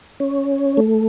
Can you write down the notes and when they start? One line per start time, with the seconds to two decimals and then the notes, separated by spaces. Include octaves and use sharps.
0.20 C#4
0.77 A3